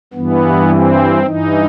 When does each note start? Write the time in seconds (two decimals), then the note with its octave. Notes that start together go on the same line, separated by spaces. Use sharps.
0.13 G2 E3 B3
0.69 C4
1.23 G2 E3 D#4